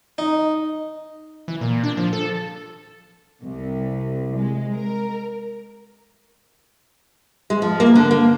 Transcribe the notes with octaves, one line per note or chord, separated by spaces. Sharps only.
D#4
E3
A#2
D4
F3
A4
C2
G#3
A#4
G#3
F3
A#3
D3
A#3